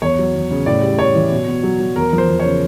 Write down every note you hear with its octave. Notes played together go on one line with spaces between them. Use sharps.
E2 C#5
F#3
E2
C#3
A2 D5
G3
A2 C#5
E3
B2
B2
F#3
F#3
E2 A#4
F3
C5
E2
C#5
C#3